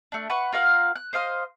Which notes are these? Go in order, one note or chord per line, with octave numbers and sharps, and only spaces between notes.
A3 D4
B4 F#5 C#6
F4 A#4 F5 F#5
F#6
C5 D#5 F5 C6